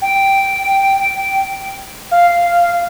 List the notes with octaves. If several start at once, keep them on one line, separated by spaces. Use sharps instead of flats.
G5
F5